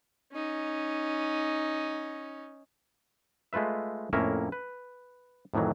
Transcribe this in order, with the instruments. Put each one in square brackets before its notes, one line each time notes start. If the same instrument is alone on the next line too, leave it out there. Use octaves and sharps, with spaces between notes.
[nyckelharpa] C#4 D#4
[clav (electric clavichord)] G#3 A3 F4 B4 E5
F2 A2 A#3 C#4 A#4 E5
B4
F2 A2 D#3 E3 F#3